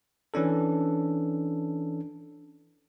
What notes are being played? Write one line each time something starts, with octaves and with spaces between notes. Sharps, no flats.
E3 C#4 D4 A4